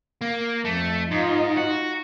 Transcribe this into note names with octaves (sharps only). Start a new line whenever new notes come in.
A#3
F2 A3
G#2 D#4 F4
F#4